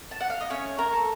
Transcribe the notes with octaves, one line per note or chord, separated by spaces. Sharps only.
A5
F#5
F5
D#5
A3 C#4 C#5
A#4 A#5
A4